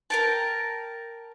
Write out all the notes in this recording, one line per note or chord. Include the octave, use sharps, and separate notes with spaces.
A#4 G5 A5